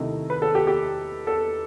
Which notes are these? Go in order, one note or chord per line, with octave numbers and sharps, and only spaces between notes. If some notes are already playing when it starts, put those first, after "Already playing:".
Already playing: C3 D#3 A3 E4 D#5
B4
A4
G4
G4
A4